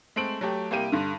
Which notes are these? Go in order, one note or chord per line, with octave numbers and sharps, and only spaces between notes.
G#3 A3 C4 D7 F#7
F#3 A3 G4
C2 A#3 G4 D#7
G2 D3